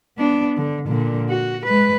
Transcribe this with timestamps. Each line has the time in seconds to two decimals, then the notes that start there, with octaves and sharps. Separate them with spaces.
0.18 B3 D4
0.57 D3
0.88 A#2 D3
1.29 F#4
1.66 G#3 B4